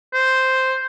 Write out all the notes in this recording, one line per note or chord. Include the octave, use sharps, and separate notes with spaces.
C5